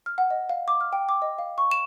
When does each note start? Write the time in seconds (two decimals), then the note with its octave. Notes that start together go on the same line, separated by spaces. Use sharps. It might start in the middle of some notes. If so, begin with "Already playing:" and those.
0.06 F6
0.18 F#5
0.30 D#5
0.49 F5
0.68 D6
0.81 F6
0.93 G5
1.09 D6
1.22 D#5
1.38 F5
1.58 C#6
1.71 E7